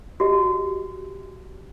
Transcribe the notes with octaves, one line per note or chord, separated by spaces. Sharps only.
F#4 G4 D#5